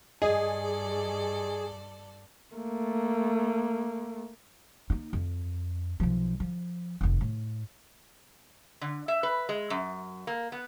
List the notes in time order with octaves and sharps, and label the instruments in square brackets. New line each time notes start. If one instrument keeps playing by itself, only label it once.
[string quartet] G2 A4 D5 [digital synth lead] G#4 [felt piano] D#5
[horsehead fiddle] A3 A#3
[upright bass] A#3 D#4
F2
B1 F3
F3
F1 D#2
A2
[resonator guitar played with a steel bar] D3
E5
B4
G#3
F#2
A#3
B3